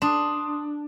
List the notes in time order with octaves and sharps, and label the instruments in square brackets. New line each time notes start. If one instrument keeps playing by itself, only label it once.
[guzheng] D4 [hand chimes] C6 D#6